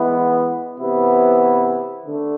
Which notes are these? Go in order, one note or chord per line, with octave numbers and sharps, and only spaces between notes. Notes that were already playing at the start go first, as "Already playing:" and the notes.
Already playing: E3 G#3 B3 E4
C3 E3 B3 E4
D3 A3